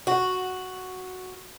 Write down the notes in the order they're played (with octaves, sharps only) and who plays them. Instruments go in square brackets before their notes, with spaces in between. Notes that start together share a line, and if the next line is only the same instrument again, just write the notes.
[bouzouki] F#4